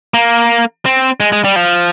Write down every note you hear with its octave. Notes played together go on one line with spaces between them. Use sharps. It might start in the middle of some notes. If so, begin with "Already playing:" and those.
A#3
C4
G#3
G#3
G3
F3